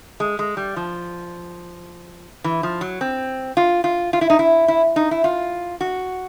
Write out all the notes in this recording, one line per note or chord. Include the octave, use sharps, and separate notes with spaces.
G#3
G#3
G3
F3
E3
F3
F#3
C4
F4
F4
F4
E4
D#4
E4
E4
D#4
E4
F4
F#4